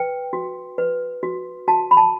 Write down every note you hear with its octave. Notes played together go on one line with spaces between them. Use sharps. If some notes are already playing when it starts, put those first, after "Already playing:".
Already playing: B4 G5
F#4
B4
F#4
F#4 A5
B5
A5